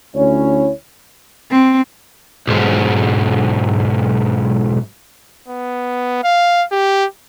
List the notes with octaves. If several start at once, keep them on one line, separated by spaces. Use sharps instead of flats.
D2 C#4 E4 C#5
C4
B1 G#2
B3
F5
G4